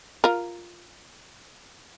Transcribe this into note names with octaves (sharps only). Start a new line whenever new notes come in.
F4 A#4